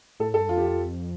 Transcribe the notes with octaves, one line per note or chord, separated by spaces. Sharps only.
A2 A4
G2 A4
F2 F4
G4
F4